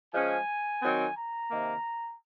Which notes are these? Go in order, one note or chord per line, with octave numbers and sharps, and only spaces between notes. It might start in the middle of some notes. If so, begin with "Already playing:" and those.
F3 G#3 C#4 G#5
D#3 F#3 C4
A#5
C3 D#3 A#3